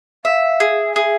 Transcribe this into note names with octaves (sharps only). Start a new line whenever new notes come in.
E5 F5
G#4
G#4 E5